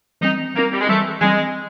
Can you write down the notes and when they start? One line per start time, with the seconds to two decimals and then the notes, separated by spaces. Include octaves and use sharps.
0.21 E3 G3 C4 D#4
0.54 E3 G3 A#3 C4
0.72 G3
0.80 G#3
0.87 E3 G3 A3 C4
1.21 E3 G3 G#3 C4